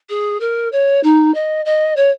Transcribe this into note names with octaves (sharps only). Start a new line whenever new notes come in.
G#4
A#4
C#5
D#4
D#5
D#5
C#5